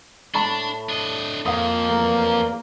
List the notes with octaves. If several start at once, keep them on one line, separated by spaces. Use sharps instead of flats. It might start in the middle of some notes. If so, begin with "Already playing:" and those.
A2 D4 A5 B5 C#6
D4 D#5
F2 A#3 F5 D#6
E2 A3 A#4